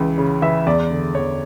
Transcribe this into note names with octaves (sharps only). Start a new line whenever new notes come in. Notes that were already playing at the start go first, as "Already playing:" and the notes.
Already playing: C#2 E3
C#3
E3 E5
E2 D5
D3
E2 C#5